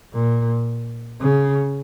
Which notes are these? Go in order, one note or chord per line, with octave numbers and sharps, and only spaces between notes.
A#2
C#3